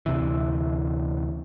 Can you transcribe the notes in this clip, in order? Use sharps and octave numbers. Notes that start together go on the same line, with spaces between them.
D2 C3 E3